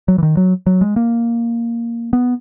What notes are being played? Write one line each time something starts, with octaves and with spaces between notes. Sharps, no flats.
F#3
E3
D#3
F#3
F#3
G#3
A#3
B3